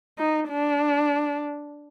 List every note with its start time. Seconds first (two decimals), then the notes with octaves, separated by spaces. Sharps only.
0.18 D#4
0.49 D4